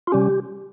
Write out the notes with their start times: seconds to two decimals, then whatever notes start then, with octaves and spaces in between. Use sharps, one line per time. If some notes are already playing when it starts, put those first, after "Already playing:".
0.07 F4
0.12 C3 G3 C#4 G4